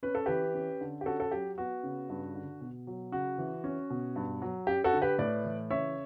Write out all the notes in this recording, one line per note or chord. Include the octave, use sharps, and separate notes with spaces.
C#4 B4
A4
E3 G4 B4
C#4
D3
G4
C#4 F#4 A4
A4
F#3 G4
B3 F#4
C#3
G2
D3
B2
F#3
C#3 F#4
E3
C#4
B2
G2
F#3
F#2 G4
F#4 A4
D3
G4 B4
A2 B4 D5
E3
C#3 C#5 E5